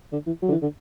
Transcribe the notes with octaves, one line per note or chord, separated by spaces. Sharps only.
D3
E3
F#3
D3
E3
D3